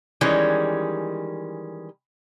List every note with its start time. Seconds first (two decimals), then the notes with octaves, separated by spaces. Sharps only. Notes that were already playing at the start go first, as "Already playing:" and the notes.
0.21 D#3 E3 G3 G#3 C#4